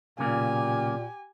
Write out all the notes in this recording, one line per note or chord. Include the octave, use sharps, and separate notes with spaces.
B1 A#2 C#3 A#3 G4 G#5